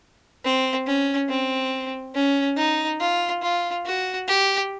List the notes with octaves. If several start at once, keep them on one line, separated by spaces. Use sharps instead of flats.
C4
C#4
C4
C#4
D#4
F4
F4
F#4
G4